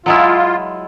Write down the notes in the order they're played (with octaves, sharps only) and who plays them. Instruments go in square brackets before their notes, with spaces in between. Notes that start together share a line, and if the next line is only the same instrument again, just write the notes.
[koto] F#3 G#3 E4 [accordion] F4